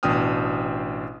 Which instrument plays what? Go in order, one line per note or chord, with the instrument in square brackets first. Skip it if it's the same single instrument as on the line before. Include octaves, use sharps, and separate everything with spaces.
[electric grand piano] A1 B2 D4 G5 D#6 F6